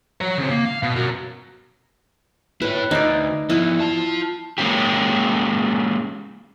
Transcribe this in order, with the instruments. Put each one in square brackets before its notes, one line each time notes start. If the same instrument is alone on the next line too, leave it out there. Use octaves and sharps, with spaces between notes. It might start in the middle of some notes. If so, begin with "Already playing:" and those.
[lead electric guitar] C#5 A#5
C#3 C4
A#3
F5
B2
F#4 A#4
[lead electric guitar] E4 C#5 [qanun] B4
[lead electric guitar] D2 [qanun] D#4 D5
[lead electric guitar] F3 B3 [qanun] E4
[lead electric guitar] F4 A5
[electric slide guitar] G#3 A#3 C#4 G4